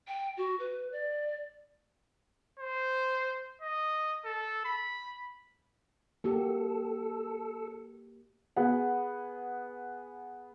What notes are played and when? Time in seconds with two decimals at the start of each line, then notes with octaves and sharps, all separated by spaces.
0.08 G5
0.37 F#4
0.59 B4
0.92 D5
2.60 C5
3.62 D#5
4.25 A4
4.65 B5
6.24 A#3 F#4 G4 A4
8.56 B3 G#4 F#5